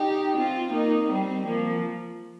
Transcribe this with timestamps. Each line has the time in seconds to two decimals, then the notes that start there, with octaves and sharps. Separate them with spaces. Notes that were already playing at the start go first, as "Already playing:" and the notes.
Already playing: D#4 G4
0.37 C4 F4
0.73 A#3 D#4
1.09 G3 C4
1.46 F3 A#3